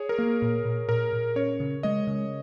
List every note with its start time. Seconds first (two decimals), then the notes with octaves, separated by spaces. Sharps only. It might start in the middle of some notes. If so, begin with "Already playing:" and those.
Already playing: G#4 C#5
0.09 A#4
0.18 A#3
0.42 A#2
0.65 A#2
0.89 A#2 A#4
1.13 A#2
1.36 C#4 C#5
1.60 C#3
1.83 G#3 D#5
2.07 C#3